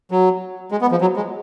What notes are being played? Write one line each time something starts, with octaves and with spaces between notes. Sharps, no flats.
F#3
G#3
B3
F3
F#3
G#3